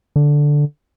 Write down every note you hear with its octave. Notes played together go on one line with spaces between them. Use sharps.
D3